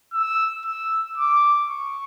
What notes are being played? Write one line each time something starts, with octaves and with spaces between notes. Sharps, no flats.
E6
E6
D6
C#6